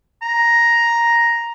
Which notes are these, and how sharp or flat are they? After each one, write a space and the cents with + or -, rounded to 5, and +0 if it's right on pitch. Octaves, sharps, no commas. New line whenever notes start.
A#5 +5